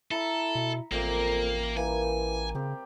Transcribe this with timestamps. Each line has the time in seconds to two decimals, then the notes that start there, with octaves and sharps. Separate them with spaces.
0.11 E4 A4 E5 A#5 B5
0.55 B2
0.92 A1 F2 A#2 A#3 E5 G5
1.77 E3 G3 A#3 G#5
2.55 C#3 C4 G4